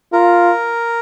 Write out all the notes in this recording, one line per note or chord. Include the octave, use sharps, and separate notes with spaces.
F4 A#4